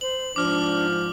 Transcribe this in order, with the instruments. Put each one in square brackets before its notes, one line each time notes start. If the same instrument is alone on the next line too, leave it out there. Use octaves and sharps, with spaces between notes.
[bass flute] C5 [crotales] F#7
[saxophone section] G#2 F3 [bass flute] D4 [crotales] D6 F6